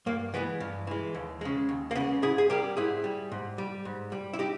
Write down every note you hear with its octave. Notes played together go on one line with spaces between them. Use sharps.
G2 A#3
E3 G#3 B3
G2
E3 G#3
D#2
C#3 G#3
D#2
A#3
C#3 G#3 B3
G#2 E4 G#4
G#4
G3 G4 A#4
G#2 E4 G#4
G3
G#2
G3
G#2
G3
E4
D#4 G4